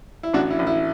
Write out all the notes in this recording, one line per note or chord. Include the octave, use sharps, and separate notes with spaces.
E4
A1 D4 F#4
E4
A1
E4